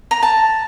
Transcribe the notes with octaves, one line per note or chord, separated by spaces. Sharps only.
A#5
A5